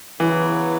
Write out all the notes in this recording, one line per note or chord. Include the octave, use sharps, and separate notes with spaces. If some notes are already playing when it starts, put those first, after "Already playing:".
C#3 E3 F#3 B3 E4